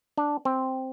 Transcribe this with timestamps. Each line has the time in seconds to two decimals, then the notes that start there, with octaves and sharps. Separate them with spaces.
0.18 D4
0.45 C4